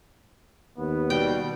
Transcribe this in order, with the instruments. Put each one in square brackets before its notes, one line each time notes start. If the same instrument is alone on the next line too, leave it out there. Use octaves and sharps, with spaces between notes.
[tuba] D#2 [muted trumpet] B3
[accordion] B2 G3 [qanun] G5